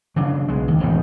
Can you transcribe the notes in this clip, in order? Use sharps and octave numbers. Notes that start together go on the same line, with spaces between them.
C#3 F#3 D4
B1 G#3
D#2
E1 A1 D#3